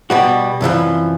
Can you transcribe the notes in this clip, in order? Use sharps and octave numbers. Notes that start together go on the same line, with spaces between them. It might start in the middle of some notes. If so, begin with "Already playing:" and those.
B2 G3 F#4
C2 F#2 E3 F3